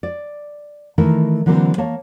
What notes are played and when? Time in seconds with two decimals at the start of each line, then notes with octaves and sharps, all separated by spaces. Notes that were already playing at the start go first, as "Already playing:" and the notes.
0.03 D5
0.98 D#3 E3 A3 D#4 E4 A#4
1.46 D3 E3 F#3 A#3 C4 C5
1.78 A#3 C#5 A5